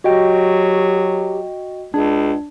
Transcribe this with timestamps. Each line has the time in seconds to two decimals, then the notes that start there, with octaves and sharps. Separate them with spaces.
0.04 F#3 F#4 G4 D#5 G5
1.94 C#2 D4 G#4